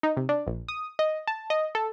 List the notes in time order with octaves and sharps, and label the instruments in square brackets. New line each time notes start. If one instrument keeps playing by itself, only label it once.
[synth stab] D#4
C3
D4
A#1
D#6
D#5
A5
D#5
A4